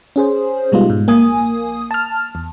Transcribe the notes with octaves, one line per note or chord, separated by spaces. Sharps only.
C#4 G#4 C5
B2 G3 G#3 B3 D#4 F4
G#2
A#1 A#3 G#5 D#6
A5 F6
E2